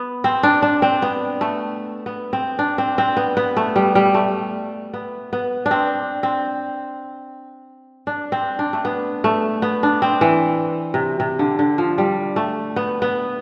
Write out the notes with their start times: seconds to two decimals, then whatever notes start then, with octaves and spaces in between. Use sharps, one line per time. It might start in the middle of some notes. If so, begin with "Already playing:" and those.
Already playing: B3
0.24 C4
0.43 D4
0.62 D4
0.82 C4
1.02 B3
1.41 A3
2.06 B3
2.33 C4
2.59 D4
2.78 C4
2.98 C4
3.17 B3
3.37 B3
3.57 A3
3.76 G3
3.95 G3
4.14 A3
4.94 B3
5.33 B3
5.66 D4
5.71 C4
6.23 C4
8.07 D4
8.32 C4
8.59 D4
8.73 A3
8.85 B3
9.24 A3
9.62 B3
9.83 D4
10.02 C4
10.21 E3
10.94 C3
11.20 C3
11.39 D3
11.59 D3
11.78 F3
11.98 G3
12.36 A3
12.76 B3
13.02 B3